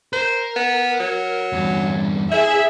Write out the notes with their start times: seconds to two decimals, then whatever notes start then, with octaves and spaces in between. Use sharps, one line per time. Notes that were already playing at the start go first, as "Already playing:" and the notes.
0.13 A#4 C5
0.56 B3
1.00 F#3
1.53 E2 G2
2.31 E4 G#4 E5